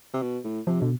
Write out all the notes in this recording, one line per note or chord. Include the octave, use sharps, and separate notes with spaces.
C3
B2
A2
C3 F3
B2 D3